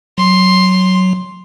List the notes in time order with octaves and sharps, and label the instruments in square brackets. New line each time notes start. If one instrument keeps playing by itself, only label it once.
[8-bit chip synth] F#3 [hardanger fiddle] C6